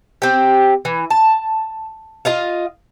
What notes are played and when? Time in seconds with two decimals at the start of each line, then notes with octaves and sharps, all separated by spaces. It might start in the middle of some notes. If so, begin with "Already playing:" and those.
0.22 C4 G4
0.85 E3
1.10 A5
2.25 F4 D#5 F5